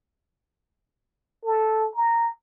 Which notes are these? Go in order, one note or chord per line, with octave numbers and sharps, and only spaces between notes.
A4
A#5